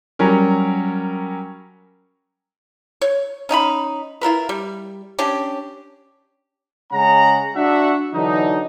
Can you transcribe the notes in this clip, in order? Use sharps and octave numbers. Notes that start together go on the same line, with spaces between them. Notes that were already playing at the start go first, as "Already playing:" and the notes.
F#3 G3 C#4 A#4
C#5
C#4 D#4 G#5 B5
E4 F4 A#4 B4
G3
C#4 D4 G4
C#3 G#3 C#4 G#4 F#5 A#5
D4 F#4 E5 F#5
D3 E3 F#3 D4 D#4